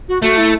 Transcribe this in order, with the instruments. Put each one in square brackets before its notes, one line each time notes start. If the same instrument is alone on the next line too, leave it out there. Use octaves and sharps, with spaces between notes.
[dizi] F#4
[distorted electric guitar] A3 [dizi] F#4
[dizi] E4